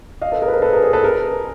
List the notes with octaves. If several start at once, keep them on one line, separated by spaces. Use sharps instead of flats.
D#5 F5
A4 B4
G#4 A#4
B4
A#4 C5
A4 B4
G#4 A#4
G#4 A#4
A4 B4
G#4 A#4